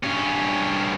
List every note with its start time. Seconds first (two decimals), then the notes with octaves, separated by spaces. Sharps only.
0.04 G2 C#4